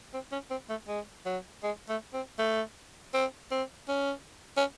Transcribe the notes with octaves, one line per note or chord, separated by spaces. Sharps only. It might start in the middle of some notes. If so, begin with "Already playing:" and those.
C4
C#4
C4
A3
G#3
F#3
G#3
A3
C4
A3
C4
C4
C#4
C#4